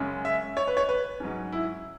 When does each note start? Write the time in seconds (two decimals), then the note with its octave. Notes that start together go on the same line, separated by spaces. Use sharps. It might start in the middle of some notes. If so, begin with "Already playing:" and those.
Already playing: F#2 C#3 G#3 C#4
0.25 E5
0.57 C#5
0.67 B4
0.77 C#5
0.89 B4
1.20 G#2 F#3 C#4
1.52 E4